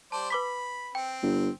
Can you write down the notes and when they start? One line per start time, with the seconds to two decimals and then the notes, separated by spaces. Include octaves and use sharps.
0.12 G3 C5 D5 A5
0.30 B4 B5 D6 B6
0.95 C4 G5
1.23 G1